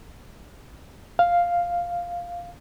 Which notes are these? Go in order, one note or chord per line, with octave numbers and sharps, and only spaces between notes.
F5